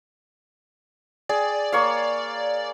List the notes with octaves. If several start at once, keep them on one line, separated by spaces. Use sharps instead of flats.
G#4 D5
A#3 C#5 F5